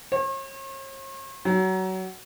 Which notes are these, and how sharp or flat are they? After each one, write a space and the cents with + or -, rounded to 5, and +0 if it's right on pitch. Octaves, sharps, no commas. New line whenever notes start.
C#5 -45
F#3 +25